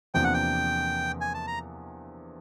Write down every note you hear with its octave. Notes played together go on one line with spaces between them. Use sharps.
E2 C3 F3 A#3 D4 G5
F#5
G5
G#5
A5
A#5